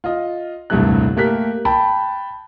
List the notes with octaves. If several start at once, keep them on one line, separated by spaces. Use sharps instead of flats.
F4 D#5
D#1 C2 G2 A3 G4 F#6
A3 A#3 G4 A#4 F#6 B6
G5 A5 B5